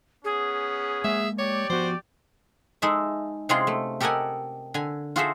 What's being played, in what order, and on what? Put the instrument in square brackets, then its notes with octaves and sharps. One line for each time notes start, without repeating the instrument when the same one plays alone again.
[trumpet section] B3 C#4 [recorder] G#4
[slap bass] G#3 A#3 [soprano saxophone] E5
[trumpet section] G4 D5 [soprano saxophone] C#5
[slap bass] F3 B3 [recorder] F#4 [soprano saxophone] C5
[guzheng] G#3 D#4 A4 E5
C3 G#3 C#4 F4 G#4 C6
A3
G4 A4 A#4 D#5 F#5 G#5
D3 G#5
F4 F#4 G#4 A4 C5 E5